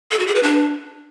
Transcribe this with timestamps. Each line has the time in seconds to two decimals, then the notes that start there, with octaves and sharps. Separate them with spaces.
0.11 A4
0.19 F#4
0.27 G#4
0.35 B4
0.43 D4